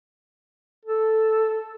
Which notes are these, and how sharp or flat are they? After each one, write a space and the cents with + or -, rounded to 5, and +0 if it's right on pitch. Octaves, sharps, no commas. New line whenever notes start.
A4 +0